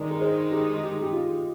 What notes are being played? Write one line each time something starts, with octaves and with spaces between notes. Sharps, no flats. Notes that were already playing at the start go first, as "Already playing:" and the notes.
Already playing: D#3 G#3 D#4 A#4 D5
A#4
G#4 C5
G4 A#4
G4
G4
F4